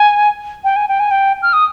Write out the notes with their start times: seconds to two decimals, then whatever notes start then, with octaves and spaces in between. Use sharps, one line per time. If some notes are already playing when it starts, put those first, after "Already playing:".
Already playing: G#5
0.64 G5
0.76 G#5
0.88 G5
1.00 G#5
1.11 G5
1.42 F6
1.53 D#6